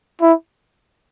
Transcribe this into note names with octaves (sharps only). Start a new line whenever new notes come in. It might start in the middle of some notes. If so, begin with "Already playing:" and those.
E4